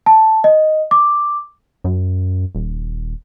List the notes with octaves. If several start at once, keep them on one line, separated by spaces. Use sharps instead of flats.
A5
D#5
D6
F#2
D#1